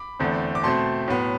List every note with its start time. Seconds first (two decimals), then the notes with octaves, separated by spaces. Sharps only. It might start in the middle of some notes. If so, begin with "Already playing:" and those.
Already playing: B5 D6
0.20 E2 D3 A3 C4
0.55 D6
0.64 B2 A3 C4 A5 C6
1.08 A2 F#3 B3